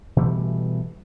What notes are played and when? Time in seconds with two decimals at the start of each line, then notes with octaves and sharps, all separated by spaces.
0.16 B2 E3 G3 A3